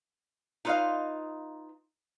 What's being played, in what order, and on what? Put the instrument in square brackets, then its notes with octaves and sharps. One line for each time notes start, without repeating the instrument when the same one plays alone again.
[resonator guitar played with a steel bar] D#4 F4 B4 C5 D#5 F5